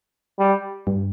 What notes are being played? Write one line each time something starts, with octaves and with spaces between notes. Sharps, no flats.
G3
G2